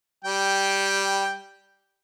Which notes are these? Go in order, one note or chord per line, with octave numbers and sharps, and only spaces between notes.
G3 G5